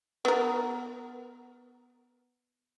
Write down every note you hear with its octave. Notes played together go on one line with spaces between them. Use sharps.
B3 A#4